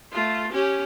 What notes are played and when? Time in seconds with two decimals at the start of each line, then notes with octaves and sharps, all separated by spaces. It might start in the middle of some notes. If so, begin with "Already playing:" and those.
0.13 A3 F4
0.52 C#4 G4